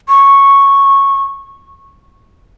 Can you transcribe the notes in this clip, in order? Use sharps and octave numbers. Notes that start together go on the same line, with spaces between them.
C#6